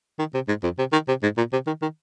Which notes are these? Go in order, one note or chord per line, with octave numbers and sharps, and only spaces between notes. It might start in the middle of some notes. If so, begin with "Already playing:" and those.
D#3
C3
G#2
F2
C3
D#3
C3
G#2
A#2
C3
D#3
D#3